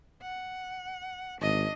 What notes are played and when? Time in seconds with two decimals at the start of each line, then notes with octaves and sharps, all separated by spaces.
0.22 F#5
1.41 G#1 D4 D#5